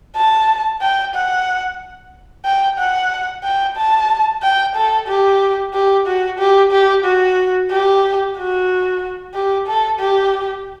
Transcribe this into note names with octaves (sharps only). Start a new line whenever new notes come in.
A5
G5
F#5
G5
F#5
G5
A5
G5
A4
G4
G4
F#4
G4
G4
F#4
G4
F#4
G4
A4
G4